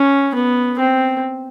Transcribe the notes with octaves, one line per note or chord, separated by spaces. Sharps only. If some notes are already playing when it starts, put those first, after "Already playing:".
Already playing: C#4
B3
C4